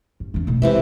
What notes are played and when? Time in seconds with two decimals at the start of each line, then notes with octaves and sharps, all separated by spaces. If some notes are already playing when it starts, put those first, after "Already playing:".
0.20 G2
0.34 E2 D4
0.47 B2 A3
0.62 C3 E3 G#3 E5